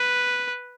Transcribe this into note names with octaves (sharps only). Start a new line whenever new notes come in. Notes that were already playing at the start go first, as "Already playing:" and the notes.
Already playing: B4